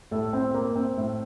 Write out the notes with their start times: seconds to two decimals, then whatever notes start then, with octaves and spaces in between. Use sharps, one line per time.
0.11 A2 A4
0.33 C4
0.54 A#3
0.76 C4
0.97 A2